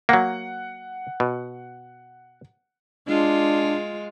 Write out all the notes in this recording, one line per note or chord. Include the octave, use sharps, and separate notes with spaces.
F#3 A#3 F#5
B2
G#3 D4 F4